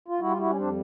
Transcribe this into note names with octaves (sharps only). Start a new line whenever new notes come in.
F4
G3 E4 F#4
F4
E4 F#4
C#4
F2 C4 D4